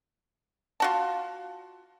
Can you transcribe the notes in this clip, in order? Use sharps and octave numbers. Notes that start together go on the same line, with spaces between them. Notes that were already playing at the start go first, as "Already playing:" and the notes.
F4 F#4 A5